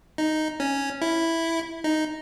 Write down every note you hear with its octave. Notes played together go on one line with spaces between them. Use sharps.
D#4
C#4
E4
D#4